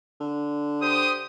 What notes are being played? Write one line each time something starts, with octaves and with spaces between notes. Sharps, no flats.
D3
G4 C5 D#6